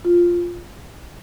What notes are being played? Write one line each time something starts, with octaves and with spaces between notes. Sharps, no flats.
F4